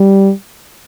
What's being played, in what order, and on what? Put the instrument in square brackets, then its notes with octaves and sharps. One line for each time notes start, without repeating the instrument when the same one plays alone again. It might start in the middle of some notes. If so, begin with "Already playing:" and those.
Already playing: [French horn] G3